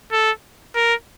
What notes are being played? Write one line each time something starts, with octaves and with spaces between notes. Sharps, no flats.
A4
A#4